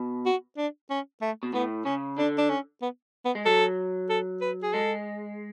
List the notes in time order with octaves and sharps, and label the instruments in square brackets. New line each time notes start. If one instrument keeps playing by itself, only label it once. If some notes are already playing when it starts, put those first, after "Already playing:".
Already playing: [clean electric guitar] B2
[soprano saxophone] F#4
D4
C#4
A3
[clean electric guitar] B2
[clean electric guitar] A2 [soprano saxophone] B3
[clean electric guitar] C#3 [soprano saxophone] C#4
[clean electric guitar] D3 [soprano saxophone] D4
[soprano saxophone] D4
C#4
B3
B3
[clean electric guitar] G#3
[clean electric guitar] F#3 [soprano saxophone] A4
[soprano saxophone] A4
B4
G#4
[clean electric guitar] G#3 [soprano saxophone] A4